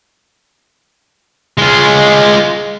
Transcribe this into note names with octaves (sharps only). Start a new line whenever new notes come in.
G#3 F4